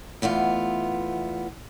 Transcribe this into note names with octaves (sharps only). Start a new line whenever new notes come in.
E2 A3 B3 F4